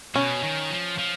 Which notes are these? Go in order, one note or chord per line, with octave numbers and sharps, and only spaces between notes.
B2 C#4
D#3
F3
F3